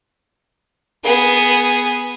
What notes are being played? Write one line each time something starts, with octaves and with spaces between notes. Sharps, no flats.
B3 G#4